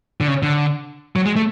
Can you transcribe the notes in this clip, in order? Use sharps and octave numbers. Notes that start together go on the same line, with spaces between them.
D3
C#3
D3
F#3
G#3
A3